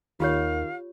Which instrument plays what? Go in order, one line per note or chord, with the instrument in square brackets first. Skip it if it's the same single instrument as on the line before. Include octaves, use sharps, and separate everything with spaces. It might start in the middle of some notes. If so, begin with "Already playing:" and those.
[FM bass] D#2 [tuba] D#3 [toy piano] F4 G4 C#5 [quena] F5